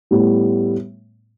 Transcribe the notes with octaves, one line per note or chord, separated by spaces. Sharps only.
A2 G3 B3